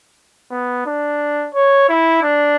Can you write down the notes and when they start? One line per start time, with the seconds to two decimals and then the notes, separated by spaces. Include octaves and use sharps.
0.51 B3
0.86 D4
1.54 C#5
1.89 E4
2.23 D4